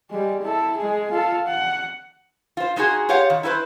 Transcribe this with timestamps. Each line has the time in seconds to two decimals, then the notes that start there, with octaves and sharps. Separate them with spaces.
0.11 G3 G#3
0.42 E4 A4
0.77 G#3 G#4
1.12 F4 A4
1.47 F#5
2.57 F4 C5
2.76 G#3 D#4 F4 F#4 G#4
3.09 F4 G4 C#5 F5 F#5
3.30 D#3
3.43 E4 F#4 A4 B4 C5